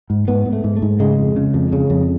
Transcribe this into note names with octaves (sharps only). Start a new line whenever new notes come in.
G#2
G#2 B3
G#2
A3
G#2
A3
G#2
C#3 G#3
F2
C#3
F2
C#3
F2